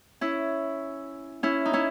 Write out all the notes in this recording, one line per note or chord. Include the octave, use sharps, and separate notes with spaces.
C#4 E4
C#4 E4
D#4
C#4 E4